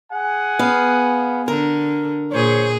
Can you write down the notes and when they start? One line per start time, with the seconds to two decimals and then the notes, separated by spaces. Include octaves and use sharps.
0.12 G#4 F#5 G#5
0.59 B3 F5
1.48 D3 A#4
2.32 A#2 G#4 C5 C#5